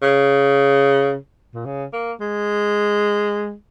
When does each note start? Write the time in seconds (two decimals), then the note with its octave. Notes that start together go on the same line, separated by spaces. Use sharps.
0.02 C#3
1.54 A#2
1.66 C#3
1.93 A#3
2.20 G#3